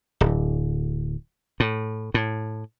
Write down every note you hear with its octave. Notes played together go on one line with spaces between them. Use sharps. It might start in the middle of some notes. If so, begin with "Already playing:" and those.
D1
A2
A2